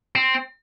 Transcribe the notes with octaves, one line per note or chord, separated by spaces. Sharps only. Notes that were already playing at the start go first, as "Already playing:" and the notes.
C4